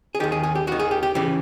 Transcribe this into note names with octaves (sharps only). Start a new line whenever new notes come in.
G#4
D#2 D#3 G4
G#4
G#4
G4
D#2 D#3 F#4
G#4
G4
G4
C#3 E3 G4